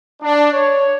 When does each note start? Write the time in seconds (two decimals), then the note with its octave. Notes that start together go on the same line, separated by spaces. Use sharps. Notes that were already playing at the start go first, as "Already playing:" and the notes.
0.23 D4
0.53 C#5